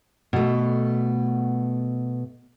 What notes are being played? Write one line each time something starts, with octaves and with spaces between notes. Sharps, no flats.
B2 A3